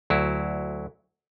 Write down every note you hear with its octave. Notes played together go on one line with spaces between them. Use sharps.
D2 F#3 E4